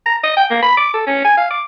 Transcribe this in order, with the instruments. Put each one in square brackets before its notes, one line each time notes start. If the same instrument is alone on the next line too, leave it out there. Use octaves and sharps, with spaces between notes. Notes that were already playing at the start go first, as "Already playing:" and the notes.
[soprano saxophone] A#5
D#5
G5
A#3
B5
D6
A4
C#4
G#5
F5
D6